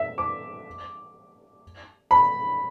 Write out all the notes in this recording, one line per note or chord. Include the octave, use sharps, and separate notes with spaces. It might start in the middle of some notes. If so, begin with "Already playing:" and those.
Already playing: E5
D6
B5